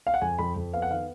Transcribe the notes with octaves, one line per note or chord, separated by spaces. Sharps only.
F5
F#5
F2 G#5
F2 B5
F2
B3 F5
F#5
D#3 F5